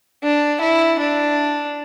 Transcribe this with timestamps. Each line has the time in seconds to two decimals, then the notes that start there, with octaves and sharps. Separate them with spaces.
0.23 D4
0.61 E4
0.99 D4